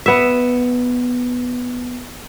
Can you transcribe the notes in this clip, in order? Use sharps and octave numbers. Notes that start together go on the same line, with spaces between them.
B3 E5